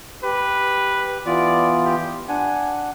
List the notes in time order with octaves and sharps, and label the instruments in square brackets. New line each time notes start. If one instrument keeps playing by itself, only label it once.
[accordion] G4 [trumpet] B4
[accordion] E3 B3 F4 [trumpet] D5
[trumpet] G4
[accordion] D4 F#5 [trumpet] G#5